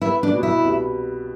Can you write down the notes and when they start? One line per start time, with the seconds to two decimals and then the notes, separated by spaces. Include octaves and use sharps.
0.02 B3 E4
0.23 D4
0.33 B2
0.43 E4
0.64 C2